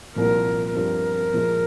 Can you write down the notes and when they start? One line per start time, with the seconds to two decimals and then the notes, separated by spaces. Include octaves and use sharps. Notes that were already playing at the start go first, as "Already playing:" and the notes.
0.16 C2 A#2 F3 A#4
0.74 G2 F3 C4 F4 A#4
1.32 A#2 F3 G#3